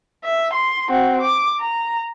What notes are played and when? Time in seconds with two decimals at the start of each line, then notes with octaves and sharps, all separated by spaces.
0.24 E5
0.53 C6
0.89 C4 F#4
1.21 D6
1.60 A#5